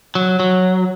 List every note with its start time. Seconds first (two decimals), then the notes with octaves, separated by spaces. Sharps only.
0.15 F#3
0.40 F#3